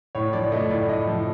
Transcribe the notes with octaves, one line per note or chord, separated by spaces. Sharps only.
A2 C#5
F3 D5
A3 D#5
A2 D5
A2 D#5
F3